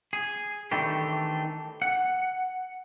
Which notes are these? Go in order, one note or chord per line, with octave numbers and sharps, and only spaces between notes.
G#4
D#3 E3 A3 C4 D4 G4
F#5